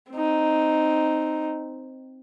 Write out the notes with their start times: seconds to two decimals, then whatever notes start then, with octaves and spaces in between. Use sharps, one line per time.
0.11 C4 D#4